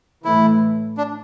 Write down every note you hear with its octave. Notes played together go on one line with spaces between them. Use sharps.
A2 E3 A3 E4
D4